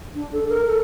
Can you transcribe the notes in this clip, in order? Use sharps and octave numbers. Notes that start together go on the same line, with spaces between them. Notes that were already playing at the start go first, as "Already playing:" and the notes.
D4
A4
A#4
A4